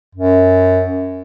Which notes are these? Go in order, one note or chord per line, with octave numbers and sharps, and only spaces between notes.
F#2